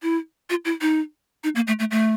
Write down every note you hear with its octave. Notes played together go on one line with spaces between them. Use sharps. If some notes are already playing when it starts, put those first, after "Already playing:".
E4
F4
E4
D#4
D#4
A#3
A3
A3
A3